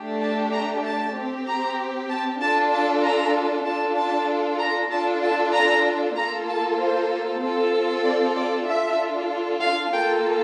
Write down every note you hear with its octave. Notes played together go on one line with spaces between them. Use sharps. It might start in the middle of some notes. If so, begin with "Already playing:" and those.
Already playing: A3 D4 G4
A5
A#5
A5
C4 G4
A#5
A5
D4 F4 A4 A5
A5
A#5
D4 F4 A4 A5
A5
A#5
D4 F4 A4 A5
A5
A#5
A#3 F4 A4 A#5
A5
C5
C4 F4 A4
D5
D5
D4 F4 A4 E5
F5
A#3 F4 A4 G5